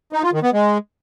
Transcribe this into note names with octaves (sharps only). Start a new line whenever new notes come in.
D#4
F4
D#3
B3
G#3